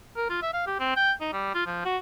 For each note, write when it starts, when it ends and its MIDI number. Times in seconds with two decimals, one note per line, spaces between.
0.16 0.29 70
0.29 0.39 65
0.42 0.51 76
0.53 0.66 77
0.67 0.78 67
0.80 0.93 60
0.96 1.12 79
1.21 1.28 63
1.33 1.51 55
1.54 1.65 65
1.66 1.85 53
1.85 1.97 66